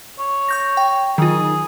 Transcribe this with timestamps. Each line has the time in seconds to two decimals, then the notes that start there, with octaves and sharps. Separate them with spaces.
0.19 C#5
0.49 C#6 G6 A#6
0.77 G5
1.18 D#3 F#3 F4 G#4